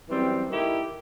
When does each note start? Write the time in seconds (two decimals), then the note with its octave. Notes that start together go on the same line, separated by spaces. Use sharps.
0.09 F#2 E3 G3 C4
0.49 D#3 A3 E4 G4